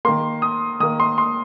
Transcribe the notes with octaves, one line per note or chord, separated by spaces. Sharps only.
D#3 A#3 C6
D#6
D#3 A#3 D#6
C6
C6